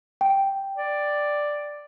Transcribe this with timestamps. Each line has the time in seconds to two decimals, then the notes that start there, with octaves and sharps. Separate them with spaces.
0.21 G5
0.77 D5